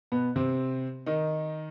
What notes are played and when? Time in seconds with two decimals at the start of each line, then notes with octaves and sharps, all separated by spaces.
0.12 B2 B3
0.36 C3 C4
1.06 D#3 D#4